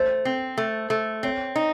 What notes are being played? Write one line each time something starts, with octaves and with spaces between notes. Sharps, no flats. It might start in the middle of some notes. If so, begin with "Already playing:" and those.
Already playing: A3 C5
C4
A3
A3
C4 C#5
D#4